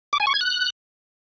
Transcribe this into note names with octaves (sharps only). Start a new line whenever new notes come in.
D6
G#5
C#6
G#6
F#6